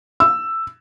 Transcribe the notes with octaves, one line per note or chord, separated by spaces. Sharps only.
E6